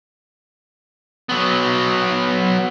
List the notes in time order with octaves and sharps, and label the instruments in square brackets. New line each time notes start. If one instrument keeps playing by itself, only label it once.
[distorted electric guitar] F#3 B3